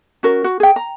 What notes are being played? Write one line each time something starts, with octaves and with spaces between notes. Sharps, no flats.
C#4 F#4 A#4
F#4
G#4 G5
A#5